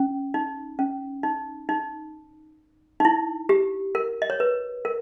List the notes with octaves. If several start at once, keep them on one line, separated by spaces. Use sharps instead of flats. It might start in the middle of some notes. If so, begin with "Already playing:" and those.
Already playing: C#4
D#4
C#4
D#4
D#4
D#4
E4
G4
A#4
D#5
C#5
B4
A#4